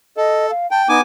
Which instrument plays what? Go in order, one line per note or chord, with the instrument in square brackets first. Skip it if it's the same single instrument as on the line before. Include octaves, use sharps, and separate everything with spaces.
[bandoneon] A4 [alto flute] D#5
[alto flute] F5
[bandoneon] G5 [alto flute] A5
[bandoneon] B3 G#5 D6 [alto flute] D#4